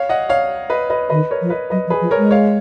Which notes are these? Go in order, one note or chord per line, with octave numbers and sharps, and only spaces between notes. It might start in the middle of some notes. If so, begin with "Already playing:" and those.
Already playing: C#5 F5
D#5 F#5
C#5 F5
B4 D#5
B4 D#5
D#3 B4 D#5
A#4 C#5
F3
B4 D#5
F#3 B4 D#5
F3
G#4 B4
F3
A#4 C#5
G#3
C#5 F5